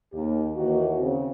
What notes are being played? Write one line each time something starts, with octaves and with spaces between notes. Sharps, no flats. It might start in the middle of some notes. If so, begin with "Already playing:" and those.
D#2 G4
D#2 E3 A#3 D#4 F#4
C#3 C4